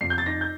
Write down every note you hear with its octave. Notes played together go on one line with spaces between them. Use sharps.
F2 C7
G6
A6
D#4 A#6
G6